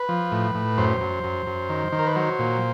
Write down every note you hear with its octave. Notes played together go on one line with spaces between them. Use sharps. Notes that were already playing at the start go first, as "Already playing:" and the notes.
Already playing: B4
F3
A2
A2
F#2 C5
F#2
F#2
F#2
D#3
D#3
A#4
B4
F#3 C5
A#2